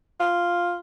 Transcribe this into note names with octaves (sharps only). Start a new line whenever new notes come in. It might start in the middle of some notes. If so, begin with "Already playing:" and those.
F4